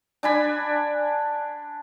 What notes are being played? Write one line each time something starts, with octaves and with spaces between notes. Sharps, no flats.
D4 G#5 B5